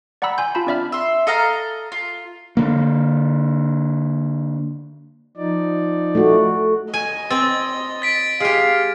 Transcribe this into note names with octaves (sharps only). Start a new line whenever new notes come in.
D5 F#5 G5 A#5 B5 E6
G#5 C6 G6
F4 F5 A5 B5
C4 D4 D5 E5 B5 F6
E5 C6
A4 D#5 F5 A#5
F4
D3 A#3
F3 D#4 D5
A3 F#4
D#5 G#5
C4 A6
A6 B6 D7
G#3 G4 F5